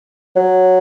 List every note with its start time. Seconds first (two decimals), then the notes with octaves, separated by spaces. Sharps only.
0.36 F#3